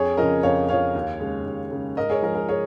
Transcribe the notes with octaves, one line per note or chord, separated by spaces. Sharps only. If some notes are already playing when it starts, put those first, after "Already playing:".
Already playing: F2 G#4 C#5
C#3 F3 A#4 D#5
F2 C#5 F5
C#3 F3 C#5 F5
D#2
C#3 G#3
D#2
C#3 G#3
G#2 A#4 D#5
G#4 C#5
F3 G#3 A#4
A#4
G#4 C#5